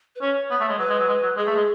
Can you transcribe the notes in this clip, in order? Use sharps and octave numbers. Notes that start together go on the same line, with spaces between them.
B4
C#4 C#5
B3
A3
G#3
F#3 B4
G#3
F#3
G#3
F#3
G#3 G#4
A3
G#3